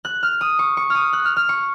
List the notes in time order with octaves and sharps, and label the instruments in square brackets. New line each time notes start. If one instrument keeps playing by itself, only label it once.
[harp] F#6
F6
D#6
C#6
C#6
D#6 F6
F#6
F6
F6
C#6